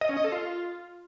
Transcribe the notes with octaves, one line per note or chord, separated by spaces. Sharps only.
D#5
C#4
D#5
A4
F4